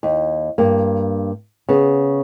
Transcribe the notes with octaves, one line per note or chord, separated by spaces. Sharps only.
D#2
G2 A#3
C#3 B3